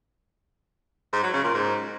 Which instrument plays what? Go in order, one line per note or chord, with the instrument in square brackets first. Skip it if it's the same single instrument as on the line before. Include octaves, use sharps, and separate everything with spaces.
[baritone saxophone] G#2
F#3
C#3
A#2
G#2